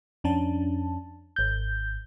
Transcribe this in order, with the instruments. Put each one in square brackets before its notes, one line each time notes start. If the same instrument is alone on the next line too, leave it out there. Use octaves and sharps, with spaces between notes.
[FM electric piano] F2 C#4 D4 A5
G#1 G6